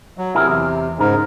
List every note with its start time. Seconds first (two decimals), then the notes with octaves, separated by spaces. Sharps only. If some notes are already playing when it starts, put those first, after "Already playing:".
0.18 F#3
0.35 C3 E4 G#4 A#4
0.49 E2
0.99 G#2 C#3 A#4